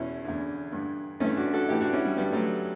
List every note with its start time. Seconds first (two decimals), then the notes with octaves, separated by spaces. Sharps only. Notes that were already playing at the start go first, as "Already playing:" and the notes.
Already playing: E2 B2 C#4 E4
0.24 E2 D3
0.72 G2 D3
1.20 G2 E3 A3 C#4
1.37 D4 F#4
1.53 F#4 A4
1.69 A2 E3 E4 G4
1.81 D4 F#4
1.93 C#4 E4
2.05 G3
2.17 G2 D3 G3 B3
2.33 F#3 A3